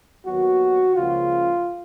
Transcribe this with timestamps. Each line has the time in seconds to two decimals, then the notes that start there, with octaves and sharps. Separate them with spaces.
0.25 D#2 D#3 F#3 B3 F#4
0.96 C#2 C#3 F3 A#3 F4